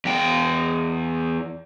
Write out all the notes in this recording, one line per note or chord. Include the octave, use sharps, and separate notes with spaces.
E2 G5